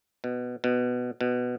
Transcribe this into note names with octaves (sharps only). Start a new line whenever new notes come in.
B2
B2
B2